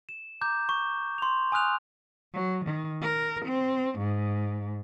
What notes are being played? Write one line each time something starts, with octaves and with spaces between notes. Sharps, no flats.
E7
A#5 D6 G6
C#6
C6 F7
G#5 D#6 F6 F#6 F7
F#3
D#3
A#4
C4
G#2